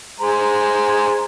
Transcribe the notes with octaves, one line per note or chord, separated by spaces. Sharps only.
G#3 C5 A#5